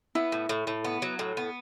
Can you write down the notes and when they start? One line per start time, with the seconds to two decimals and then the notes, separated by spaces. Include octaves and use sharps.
0.15 B3 E4
0.32 A2
0.49 A2
0.67 A2
0.85 B3
1.02 F#3
1.19 A2
1.37 B3